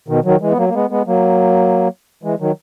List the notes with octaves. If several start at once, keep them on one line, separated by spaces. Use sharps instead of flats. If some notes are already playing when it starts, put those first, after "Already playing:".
B2 D#3
D#3 F#3
E3 G#3
B3
F#3 A#3
A#3
G#3 B3
G#3 B3
F#3 A#3
E3 G#3
D#3 F#3